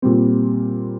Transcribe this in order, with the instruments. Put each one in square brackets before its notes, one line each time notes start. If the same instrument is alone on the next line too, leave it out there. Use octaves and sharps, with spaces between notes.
[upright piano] A#2 G3 C4